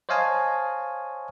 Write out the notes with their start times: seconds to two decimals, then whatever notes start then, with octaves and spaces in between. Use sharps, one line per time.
0.09 C5 C#5 D#5 F5 G#5 A5